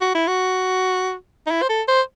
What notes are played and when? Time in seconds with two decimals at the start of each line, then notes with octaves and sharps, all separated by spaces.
0.01 F#4
0.15 E4
0.28 F#4
1.47 D#4
1.51 E4
1.62 C5
1.69 A4
1.88 C5